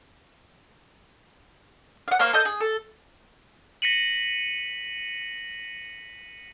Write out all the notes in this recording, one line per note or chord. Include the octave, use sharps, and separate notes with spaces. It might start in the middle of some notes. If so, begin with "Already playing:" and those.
F5 F#5
A#3 C5 F5 C#6
A4 D#5 G6
G#4
A4
A#6 B6 C#7 D#7 F#7